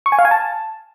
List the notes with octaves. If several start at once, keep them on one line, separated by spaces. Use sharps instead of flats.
C#6
G#5
F5
G#5
A5